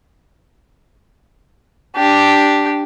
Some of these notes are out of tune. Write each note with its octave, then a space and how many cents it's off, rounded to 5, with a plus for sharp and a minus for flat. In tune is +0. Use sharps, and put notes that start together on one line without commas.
D4 +0 G4 +0